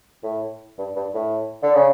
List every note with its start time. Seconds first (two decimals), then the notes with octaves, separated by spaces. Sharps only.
0.23 A2
0.78 G2
0.96 G2
1.14 A2
1.63 D3
1.75 C#3